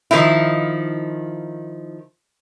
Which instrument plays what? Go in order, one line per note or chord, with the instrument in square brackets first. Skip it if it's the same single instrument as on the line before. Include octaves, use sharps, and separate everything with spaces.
[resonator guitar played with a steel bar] D#3 F3 D#4 E4